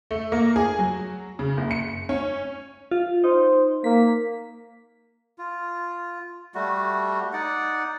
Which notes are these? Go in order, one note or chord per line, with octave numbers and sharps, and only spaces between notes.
A3
A#3
G#4
F#3
C#3
F#1
C#7
C#4
F4
D#4 C5
A#3 B6
F4
G3 A3 F#4
D#4 D5 F#5